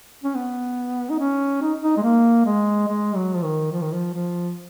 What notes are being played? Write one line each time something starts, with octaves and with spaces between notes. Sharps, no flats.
C#4
B3
D#4
C#4
D#4
D#4
G#3
A#3
G#3
G#3
F#3
F3
D#3
F3
D#3
F3
F3